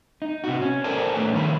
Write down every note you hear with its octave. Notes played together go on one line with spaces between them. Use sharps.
D#4
C3 F#4
C#4
A4 A#4 C5 D5 G#5 A5
A2 A3 B3 B4 C#5
D3 D#3 F3 C#5 B5